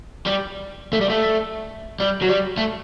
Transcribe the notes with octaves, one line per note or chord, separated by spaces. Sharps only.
G3
A3
G3
A3
G3
F#3
G3
A3